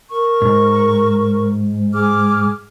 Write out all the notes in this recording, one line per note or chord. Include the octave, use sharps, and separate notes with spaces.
A#4 C#6
G#2
G#4 D6 F6